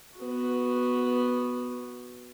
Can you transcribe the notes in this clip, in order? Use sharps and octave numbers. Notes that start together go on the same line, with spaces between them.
B3 F#4